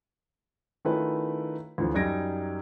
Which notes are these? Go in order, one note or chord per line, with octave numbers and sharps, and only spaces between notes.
D#3 A3 C#4 E4 F4 B4
D2 E3 F3
F#2 G3 D#4 G#6 A#6 D7